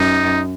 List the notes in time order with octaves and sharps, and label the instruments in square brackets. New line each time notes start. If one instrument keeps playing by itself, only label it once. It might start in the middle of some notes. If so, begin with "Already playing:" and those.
Already playing: [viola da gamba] F#2 [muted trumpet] D#4